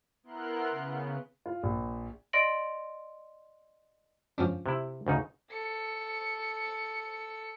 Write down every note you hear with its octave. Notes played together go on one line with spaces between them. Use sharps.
B3 E4 A#4 C6 F#6
C#3 B3
F4
A#1
D5 D#5 C6 A#6 D7 F#7
F3 C#4 D4
C3 E4
D2 C#3 D#4
A4 C#7